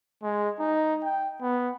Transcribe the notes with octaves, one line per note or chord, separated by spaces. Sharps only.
G#3
D#4
G5
B3